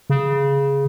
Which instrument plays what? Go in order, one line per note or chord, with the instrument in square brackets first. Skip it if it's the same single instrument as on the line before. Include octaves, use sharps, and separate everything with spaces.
[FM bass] C#3